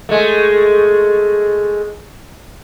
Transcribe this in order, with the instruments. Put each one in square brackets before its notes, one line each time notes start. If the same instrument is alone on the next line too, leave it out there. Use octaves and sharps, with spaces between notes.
[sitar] G#3 A3